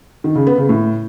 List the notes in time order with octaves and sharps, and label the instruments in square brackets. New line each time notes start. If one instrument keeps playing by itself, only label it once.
[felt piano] D#3
C#3
B3
C#3
A2